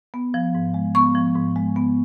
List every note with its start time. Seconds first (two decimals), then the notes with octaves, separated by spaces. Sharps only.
0.14 B3
0.34 F3
0.55 G#2
0.74 G#3
0.95 B3 C#6
1.15 F3
1.35 G#2
1.56 G#3
1.76 B3